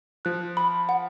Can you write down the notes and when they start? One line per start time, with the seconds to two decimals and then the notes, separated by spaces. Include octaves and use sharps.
0.25 F3 F#6
0.57 B5
0.89 F#5